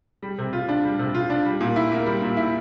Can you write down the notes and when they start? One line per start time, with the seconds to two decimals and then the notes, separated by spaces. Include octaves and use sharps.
0.23 G3
0.38 C3
0.53 F4
0.69 D4
0.84 G3
0.99 C3
1.15 F4
1.30 D4
1.45 G3
1.61 A#2
1.76 E4
1.92 A#3
2.06 G3
2.22 A#2
2.37 E4